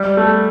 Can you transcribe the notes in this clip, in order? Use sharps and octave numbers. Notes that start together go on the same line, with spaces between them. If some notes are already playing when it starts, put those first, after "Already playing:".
Already playing: G3
A3